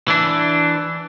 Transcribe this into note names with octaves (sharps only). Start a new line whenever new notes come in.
E3 D4